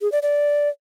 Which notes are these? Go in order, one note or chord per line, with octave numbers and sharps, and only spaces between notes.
G#4
D5
D5